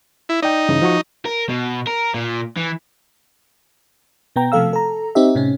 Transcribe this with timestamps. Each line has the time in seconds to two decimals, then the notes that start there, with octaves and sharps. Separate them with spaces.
0.29 E4
0.42 D#4 D5 G5
0.69 G2 C#3 E3
0.82 F3 F#4 C#6
1.26 A#4
1.49 B2
1.87 A#4
2.14 A#2
2.57 E3
4.36 B2 B3 G5 A#5
4.52 C3 F3 A3 A4 F5 E6
4.73 A4 A#5
5.15 C4 D#4 G4 E5
5.35 A2 C3 C#4